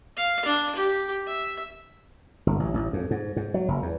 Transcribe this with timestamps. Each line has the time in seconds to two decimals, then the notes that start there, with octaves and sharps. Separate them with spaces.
0.17 F5
0.45 D4
0.76 G4
1.27 E5
2.47 G1
2.60 A1
2.74 A1
2.93 F2
3.11 G#2
3.36 G#2
3.54 F#3
3.68 F#1
3.82 E2